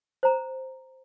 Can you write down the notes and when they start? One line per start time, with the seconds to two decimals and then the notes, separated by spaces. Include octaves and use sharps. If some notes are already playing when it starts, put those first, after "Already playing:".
0.23 C5 A#5